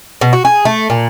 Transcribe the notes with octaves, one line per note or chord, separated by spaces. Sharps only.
B2
F#4
G#4
A3
A#2